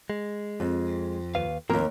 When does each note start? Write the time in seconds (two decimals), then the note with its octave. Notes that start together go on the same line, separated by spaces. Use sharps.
0.10 G#3
0.60 F2
1.35 D#2 B4 F5
1.70 D#2 F3 A#3 C4 A#4